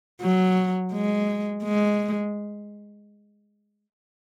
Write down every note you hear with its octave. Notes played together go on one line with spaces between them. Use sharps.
F#3
G#3
G#3